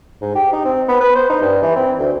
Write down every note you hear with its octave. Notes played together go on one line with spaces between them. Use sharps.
G#2
G4
D#4
C4
B3
B4
C5
D#4
G2
E3
C4
D2